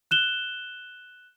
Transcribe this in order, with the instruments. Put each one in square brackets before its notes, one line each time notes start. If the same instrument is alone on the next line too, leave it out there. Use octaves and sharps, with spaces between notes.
[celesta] F#6 E7 G7